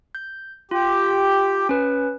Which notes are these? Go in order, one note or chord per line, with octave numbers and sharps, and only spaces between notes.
G6
F4 G4
C#4 B4